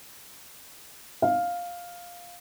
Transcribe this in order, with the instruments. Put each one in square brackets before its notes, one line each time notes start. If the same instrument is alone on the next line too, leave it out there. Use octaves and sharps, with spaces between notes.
[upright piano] F5